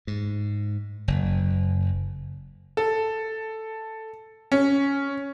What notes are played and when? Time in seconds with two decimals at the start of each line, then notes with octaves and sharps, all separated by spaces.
0.07 G#2
1.08 F#1
2.77 A4
4.52 C#4